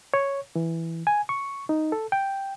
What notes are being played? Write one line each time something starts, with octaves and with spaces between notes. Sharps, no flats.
C#5
E3
G#5
C#6
D#4
A4
G5